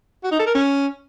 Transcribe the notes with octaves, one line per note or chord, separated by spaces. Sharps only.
F#4
D#4
A4
A#4
C#4